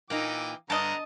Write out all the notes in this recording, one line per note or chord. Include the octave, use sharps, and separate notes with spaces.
A#2 E3 A#3 D#4 G5 D6
G2 D3 B3 D#5 A5 A#5